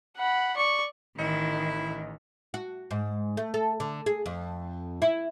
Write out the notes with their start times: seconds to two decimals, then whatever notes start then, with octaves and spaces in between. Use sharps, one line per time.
0.17 F#5 B5
0.56 D5 C#6
1.19 A1 D#3 E4 D#5 C#7
2.54 F#4
2.91 G#2
3.37 A3
3.54 A4
3.80 D3
4.06 G#4
4.26 F2
5.02 E4